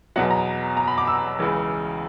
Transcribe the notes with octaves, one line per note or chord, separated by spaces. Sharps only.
E2 B2 F#3 F#5
A#5
A#5
B5
D6
E6
C#2 C#3 E3